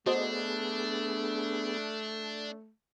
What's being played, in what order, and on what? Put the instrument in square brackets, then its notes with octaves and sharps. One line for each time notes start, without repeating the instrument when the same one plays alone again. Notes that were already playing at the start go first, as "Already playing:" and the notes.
[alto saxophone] A3 [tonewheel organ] B3 G#4 [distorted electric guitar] D4 [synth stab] F#4 C5 D#5